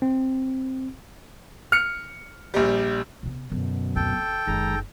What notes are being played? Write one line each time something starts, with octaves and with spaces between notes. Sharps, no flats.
C4
F6 C#7
A#1 G3
C3 B3
F#2 B2 D3
F1 D2 A4 G5
F#1 D#3 G#3 A#5